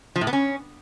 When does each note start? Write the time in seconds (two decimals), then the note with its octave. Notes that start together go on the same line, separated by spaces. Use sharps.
0.16 F3
0.21 A2
0.27 B3
0.33 C#4